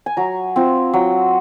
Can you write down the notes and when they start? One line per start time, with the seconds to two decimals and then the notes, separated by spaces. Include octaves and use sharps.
0.06 G#5
0.17 F#3 A#5
0.56 C4 F4
0.93 F#3